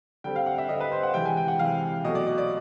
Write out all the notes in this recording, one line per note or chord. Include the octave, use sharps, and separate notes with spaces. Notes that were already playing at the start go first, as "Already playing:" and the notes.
D3 G3 C4 G5
F5
F#5
E5
D3 G3 C4 D#5
B4
C5
F#5
C3 E3 G#3 G5
G#5
G5
F#5
C3 E3 G#3 F5
B2 F#3 A3 D#5
D5
D#5
D5